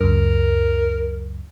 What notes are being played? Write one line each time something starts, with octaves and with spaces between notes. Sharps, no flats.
C#2 F#2 A#4